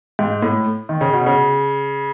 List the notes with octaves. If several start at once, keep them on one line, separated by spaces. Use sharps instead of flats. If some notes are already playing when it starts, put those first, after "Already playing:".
G#2
A2
D#3
C#3
B2
C#3